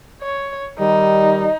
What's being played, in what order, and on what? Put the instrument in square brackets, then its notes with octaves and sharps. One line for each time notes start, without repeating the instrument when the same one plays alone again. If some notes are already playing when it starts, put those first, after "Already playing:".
[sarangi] C#5
[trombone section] D#3 G3 [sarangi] D#4